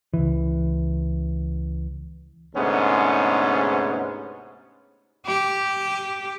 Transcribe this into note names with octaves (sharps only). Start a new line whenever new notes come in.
C#2 E3
D2 G#2 C3 B3 C#4
G4